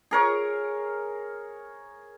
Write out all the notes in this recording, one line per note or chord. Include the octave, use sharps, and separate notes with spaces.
G#4 A#4 C#5